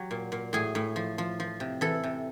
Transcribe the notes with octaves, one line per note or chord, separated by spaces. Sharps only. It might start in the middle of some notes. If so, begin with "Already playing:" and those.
Already playing: F#3 G4
A#2
A#2
A2 G#4
A2
F3
F3
F3
C3
E3 A4
C3